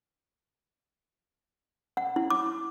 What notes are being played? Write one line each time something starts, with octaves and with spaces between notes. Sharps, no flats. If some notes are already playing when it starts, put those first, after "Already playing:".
F#5
E4
D6